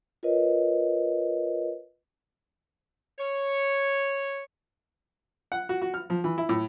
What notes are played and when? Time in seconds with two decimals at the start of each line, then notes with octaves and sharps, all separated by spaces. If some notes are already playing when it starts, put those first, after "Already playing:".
0.23 F4 A#4 B4 C#5 D#5
3.18 C#5
5.52 F#5
5.69 F#4
5.82 F#4
5.94 F6
6.10 F3
6.24 E3
6.38 E4
6.49 A2